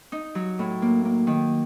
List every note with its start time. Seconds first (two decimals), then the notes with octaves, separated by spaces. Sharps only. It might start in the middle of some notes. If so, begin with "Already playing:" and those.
0.12 D#4
0.35 F#3
0.59 A2
0.82 A#3
1.05 A#3
1.27 D#3